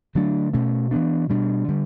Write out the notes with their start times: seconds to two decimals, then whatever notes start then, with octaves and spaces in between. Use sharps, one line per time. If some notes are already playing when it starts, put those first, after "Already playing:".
0.15 D3 F#3 A3 D4
0.53 B2 A3 C#4
0.91 E3 B3 D4
1.29 B2 G3 D4
1.68 D3 G3